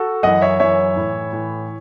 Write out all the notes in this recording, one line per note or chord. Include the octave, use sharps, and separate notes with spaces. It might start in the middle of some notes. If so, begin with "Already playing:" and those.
Already playing: F#4 A4
F#2 E3 D#5 F#5
C#5 E5
F#2 E3 C#5 E5
A2 E3
A2 E3